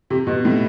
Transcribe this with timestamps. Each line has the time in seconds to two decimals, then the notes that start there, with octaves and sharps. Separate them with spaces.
0.10 C3
0.27 B2
0.45 A2